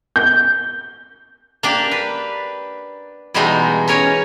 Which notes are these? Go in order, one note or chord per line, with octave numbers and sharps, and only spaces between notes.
G6
A#3 D4 G4 A5
B4
B2 E3 G3 G#3 D#4
C#4 A#4 C#5 G#5